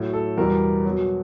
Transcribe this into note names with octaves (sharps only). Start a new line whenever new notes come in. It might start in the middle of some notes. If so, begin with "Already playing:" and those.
Already playing: A2 F#3
A4
E2 B2 G3 A#4
B2 F#3